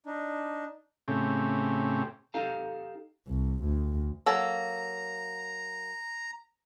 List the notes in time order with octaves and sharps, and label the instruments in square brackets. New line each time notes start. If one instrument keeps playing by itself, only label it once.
[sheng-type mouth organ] D4 D#4
[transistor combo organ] A2 C#3 C4 G4
[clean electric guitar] D#4 G4 A4 F5 A#5
[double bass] C2
D2
[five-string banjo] F#3 A#3 A4 [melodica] A#5